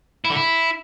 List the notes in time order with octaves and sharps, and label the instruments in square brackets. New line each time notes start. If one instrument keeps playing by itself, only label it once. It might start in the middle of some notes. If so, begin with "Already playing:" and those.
[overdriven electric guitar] E4
D3
E4